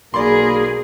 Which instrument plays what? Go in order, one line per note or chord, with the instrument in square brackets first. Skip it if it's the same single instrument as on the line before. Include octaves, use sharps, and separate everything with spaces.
[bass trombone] B1 [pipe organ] A#3 B5 [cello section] G#4 A#4 [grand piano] D5 C6